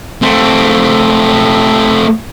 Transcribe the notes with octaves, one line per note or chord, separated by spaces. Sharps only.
A3 C4